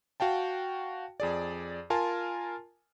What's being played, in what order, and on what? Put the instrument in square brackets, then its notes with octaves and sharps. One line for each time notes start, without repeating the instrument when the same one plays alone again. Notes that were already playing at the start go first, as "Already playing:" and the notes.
[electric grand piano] F#4 F5 G5 A5
F2 G#4 D5
F4 A#4 G#5 A5 C6